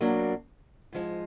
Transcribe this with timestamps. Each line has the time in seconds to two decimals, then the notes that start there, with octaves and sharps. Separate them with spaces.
0.01 B2 F#3 A#3 D4
0.93 G#2 F3 G#3